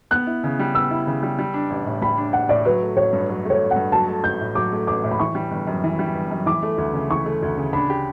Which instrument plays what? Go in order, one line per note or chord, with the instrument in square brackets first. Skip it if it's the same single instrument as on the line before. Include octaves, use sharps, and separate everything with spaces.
[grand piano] B3 [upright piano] F#6
[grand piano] E4
C#3
G3
[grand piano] B3 [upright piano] E6
[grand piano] E4
C#3
G3
G3
D4
A1
A2
[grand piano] G3 [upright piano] B5
[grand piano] D4
[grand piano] A1 [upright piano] F#5
[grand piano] A2 [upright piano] D5
[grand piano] F#3 [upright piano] B4
[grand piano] A3
[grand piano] A1 [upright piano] C#5
[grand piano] G2
F#3
[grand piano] A3 [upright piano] C#5
[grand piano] A1
[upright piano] F#5
[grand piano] G2
[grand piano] F#3 [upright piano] A5
[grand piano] A3
[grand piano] A1 [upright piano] G6
[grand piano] A2
[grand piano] F#3 [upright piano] D6
[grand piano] A3
[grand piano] A1 [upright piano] D6
[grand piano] A2
[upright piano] B5
[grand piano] E3 [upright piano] C#6
[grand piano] G3
G1
F#2
E3
G3
G1
F#2
[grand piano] E3 [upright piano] D6
[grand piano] A3
D2
C#3
[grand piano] E3 [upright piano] C#6
[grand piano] A3
D2
C#3
[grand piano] D4 [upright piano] B5
[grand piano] G4